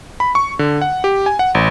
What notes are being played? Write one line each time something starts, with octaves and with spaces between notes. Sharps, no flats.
B5
C#6
D3
F#5
G4
G#5
F#5
A1